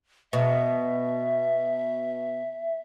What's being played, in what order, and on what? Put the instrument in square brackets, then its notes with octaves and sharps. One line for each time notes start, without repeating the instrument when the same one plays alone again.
[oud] B2 [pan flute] E5